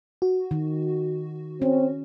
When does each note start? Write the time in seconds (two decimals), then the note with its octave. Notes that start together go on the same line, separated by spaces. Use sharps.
0.22 F#4
0.51 D#3
1.62 C4 C#4